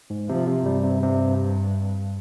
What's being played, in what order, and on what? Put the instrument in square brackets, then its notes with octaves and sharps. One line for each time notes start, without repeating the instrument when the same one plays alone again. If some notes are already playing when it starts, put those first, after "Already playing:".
[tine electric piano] G#2
[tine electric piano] C3 [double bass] F3
[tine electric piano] C3
[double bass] G2 [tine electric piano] G3
[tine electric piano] C3
C3